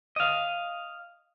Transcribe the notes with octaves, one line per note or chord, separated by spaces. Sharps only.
D#5 F5